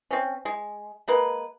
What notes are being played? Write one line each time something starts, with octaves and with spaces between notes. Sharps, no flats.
C4 C#4
G#3
G#3 A#3 B4